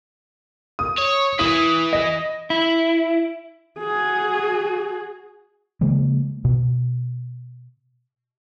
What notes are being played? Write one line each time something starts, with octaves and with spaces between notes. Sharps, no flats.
D#6
C#5
E3 E4 D#6
D#5
E4
F#4 G#4
C#3 F3 G#3 A#3
B2